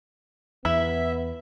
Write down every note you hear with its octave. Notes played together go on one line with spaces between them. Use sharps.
E2 B3 E4 E5